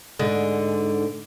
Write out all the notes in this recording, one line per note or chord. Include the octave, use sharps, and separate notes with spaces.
G#2 D3